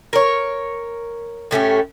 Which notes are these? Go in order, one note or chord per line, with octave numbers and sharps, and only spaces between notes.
A#4 C#5
A2 A3 C#4 G4